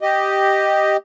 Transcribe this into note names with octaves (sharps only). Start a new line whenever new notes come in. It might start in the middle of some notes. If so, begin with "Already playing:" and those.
G4 D#5